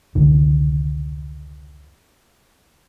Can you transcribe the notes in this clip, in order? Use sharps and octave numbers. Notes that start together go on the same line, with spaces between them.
F1 C#2 D3 D#3